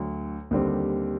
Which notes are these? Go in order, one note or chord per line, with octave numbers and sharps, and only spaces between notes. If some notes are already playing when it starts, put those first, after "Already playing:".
Already playing: D2 D3 F#3
D#2 D3 G3 C4